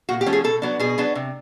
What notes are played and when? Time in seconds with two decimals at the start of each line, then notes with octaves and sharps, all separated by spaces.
0.09 A#2 F#4
0.21 G4
0.26 F3 A3 C#4
0.33 G#4
0.44 B2 A4
0.62 F#3 B3 D4
0.80 B2 G#4
0.98 F#3 B3 D4
1.15 C3